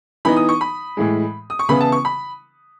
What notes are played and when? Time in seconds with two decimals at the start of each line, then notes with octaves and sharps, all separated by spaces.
0.25 E3 B3 D#4 B5
0.36 D#6
0.49 C#6
0.61 B5
0.97 A2 E3 G#3
1.50 D#6
1.59 C#6
1.69 C#3 E3 B3 E4 B5
1.81 A5
1.92 C#6
2.05 B5